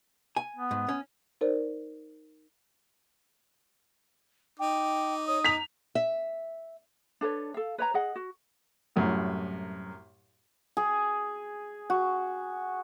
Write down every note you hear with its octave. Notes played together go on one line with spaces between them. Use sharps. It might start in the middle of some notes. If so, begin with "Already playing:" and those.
G#5
B3
G#2
C#4
D#4 A#4 C5 D5
D#4 G5 D6
C#5 D#6
A#5 B6 F7
E5
D4 A4 B4 C#5
A4 F5
B4 C#5 A#5
G#4 D#5 F#5
F#4
C2 F#2 A2
G#4
F#4